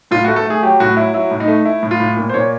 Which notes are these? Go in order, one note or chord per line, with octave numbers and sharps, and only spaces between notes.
A2 F4
A3 F#4
A4
A3 G#4
F#3 G4
A2 F#4
F#3 E4
F#3 E4
A2
D#4
A3
A3 E4
A2
F4
A2
A#2
C5
A#2 C#5